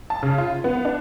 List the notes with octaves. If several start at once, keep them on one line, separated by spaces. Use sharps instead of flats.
A5
C#3
F4
B3
D4